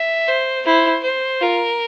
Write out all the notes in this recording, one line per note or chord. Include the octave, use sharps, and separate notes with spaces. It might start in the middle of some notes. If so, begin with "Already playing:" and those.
Already playing: E5
C5
E4 C5
C5
F4 A#4